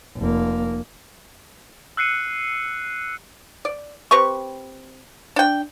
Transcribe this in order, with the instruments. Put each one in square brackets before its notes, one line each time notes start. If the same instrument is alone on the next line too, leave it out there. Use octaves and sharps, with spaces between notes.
[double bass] F1 A#3
[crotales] E6 F#6 C7 C#7 D#7
[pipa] D5
C4 G4 B4 C#6
D4 G5